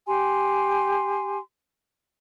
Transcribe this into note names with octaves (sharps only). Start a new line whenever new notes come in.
G4 G#5 C6